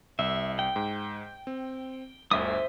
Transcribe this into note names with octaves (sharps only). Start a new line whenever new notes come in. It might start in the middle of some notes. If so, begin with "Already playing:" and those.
C2 E5
G5
G#2
C4
G1 D2 C5 E5 D#6